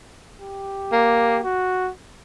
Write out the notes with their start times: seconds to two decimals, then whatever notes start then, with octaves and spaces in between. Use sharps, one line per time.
0.40 G4
0.92 A#3
1.44 F#4